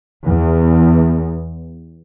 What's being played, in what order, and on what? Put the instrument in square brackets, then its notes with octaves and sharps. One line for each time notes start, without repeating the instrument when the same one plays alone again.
[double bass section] E2